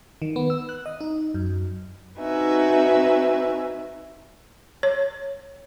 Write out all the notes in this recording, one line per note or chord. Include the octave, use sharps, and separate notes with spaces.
D#3
B3
E6
F#6
D#5
D#4
F#2
C4 D#4 F#4 B4 E5 G#5
C#5